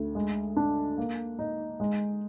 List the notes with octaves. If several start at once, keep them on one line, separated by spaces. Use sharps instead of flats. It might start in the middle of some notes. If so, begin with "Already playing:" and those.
Already playing: D2
G#3
D4
A#3
D#4
G#3